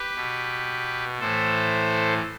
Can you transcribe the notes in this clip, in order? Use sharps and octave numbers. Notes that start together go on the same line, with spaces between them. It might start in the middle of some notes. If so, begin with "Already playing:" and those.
Already playing: G4 B4
B2
A2 E3 A4 C5